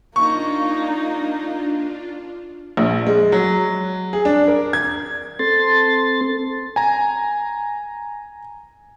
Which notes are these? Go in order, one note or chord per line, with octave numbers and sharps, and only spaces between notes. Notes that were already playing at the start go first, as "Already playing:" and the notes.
A#3 D4 D#4 F4 C#6
A#1
G#3
F#3
G#4
D4
A#4
G#6
C4 A4 C6 A6
G#5 A#5